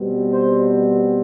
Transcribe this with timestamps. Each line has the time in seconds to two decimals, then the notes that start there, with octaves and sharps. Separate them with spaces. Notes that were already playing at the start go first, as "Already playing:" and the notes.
Already playing: B2 G3 C4
0.30 C5